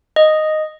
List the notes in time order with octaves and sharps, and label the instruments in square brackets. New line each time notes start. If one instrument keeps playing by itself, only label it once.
[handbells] D#5